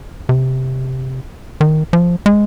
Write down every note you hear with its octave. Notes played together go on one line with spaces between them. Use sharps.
C3
D#3
F3
G#3